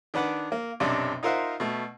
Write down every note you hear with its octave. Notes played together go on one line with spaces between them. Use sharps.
D#3 D4 B4 F#5 D6
A#3
B1 F#2 C3 D4
D#4 F4 A#4 C5 E5 F#5
B2 A3